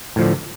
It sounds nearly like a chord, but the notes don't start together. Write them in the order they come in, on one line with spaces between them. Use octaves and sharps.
A2 F3 D3